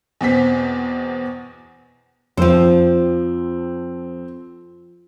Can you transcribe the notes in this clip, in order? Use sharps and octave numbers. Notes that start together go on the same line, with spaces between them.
E2 B2 C4 B6
F2 F3 C4 C5 G5 E6